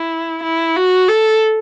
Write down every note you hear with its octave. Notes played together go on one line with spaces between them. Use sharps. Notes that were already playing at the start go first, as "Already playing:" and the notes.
Already playing: E4
E4
F#4
A4